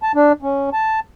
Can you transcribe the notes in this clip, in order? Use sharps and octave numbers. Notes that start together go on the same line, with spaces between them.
A5
D4
C#4
A5